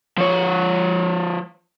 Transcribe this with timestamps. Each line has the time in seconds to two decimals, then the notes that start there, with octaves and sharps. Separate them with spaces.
0.17 F3 C#5